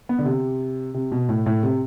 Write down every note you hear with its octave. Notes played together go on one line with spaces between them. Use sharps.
B3
D3
C3
C3
B2
A2
A2
C3